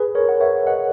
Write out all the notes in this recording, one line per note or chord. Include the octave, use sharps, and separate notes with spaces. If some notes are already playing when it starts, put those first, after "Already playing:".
Already playing: G#4 B4
A#4 C#5
F#5
C#5 E5
D#5 F#5